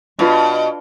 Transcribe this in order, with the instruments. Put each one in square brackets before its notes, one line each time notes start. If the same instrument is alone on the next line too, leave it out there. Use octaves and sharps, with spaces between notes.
[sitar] B2 [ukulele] D4 F4 B4